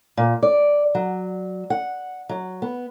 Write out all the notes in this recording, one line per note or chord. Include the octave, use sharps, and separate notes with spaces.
A#2
D5
F#3
F#5
F#3
B3